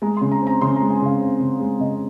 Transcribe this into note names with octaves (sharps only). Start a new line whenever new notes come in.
G#3 A#5
C6
C#3
A#5
C4
A#5
C#3 C6
A#5
G#3
G#5
C#3 F5
C4
C#3
G#3
C#3 D#5